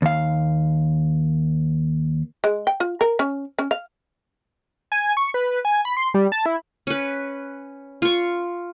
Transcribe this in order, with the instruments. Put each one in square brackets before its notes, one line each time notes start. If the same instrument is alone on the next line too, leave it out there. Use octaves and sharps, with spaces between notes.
[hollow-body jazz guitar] D#2 F5
[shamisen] G#3
G5
F4
A#4
C#4
C#4
F5
[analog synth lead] G#5
C#6
B4
G#5
B5
C6
G3
A5
E4
[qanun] C#4 B4
F4 C#6